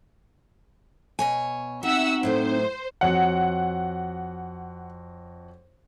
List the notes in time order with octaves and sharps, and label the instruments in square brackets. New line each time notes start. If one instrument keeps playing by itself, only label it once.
[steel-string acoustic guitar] B2 C#5 G#5
[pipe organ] C4 D#4 [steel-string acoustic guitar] F#4 [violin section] E5 F#5 E6
[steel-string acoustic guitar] A2 F#3 A3 [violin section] C5
[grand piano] F2 F#4 C#5 [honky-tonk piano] F#5